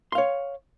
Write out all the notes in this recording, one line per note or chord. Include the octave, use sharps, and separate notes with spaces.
C#5 F5 C6